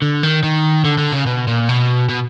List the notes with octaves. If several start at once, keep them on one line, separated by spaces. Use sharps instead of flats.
D3
D#3
D#3
D3
D3
C#3
B2
A#2
B2
B2